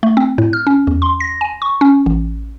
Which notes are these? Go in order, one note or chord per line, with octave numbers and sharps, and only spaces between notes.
A3
C4
A2
F6
C#4
E2
C6
A#6
G#5
C#6
C#4
A1